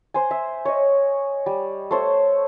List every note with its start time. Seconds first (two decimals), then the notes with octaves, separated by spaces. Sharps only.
0.14 C5 G#5
0.31 E5
0.65 C#5 D#5
1.46 G3
1.91 A3 C5 C#5